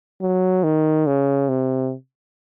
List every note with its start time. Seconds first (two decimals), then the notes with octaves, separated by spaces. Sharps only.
0.21 F#3
0.64 D#3
1.07 C#3
1.49 C3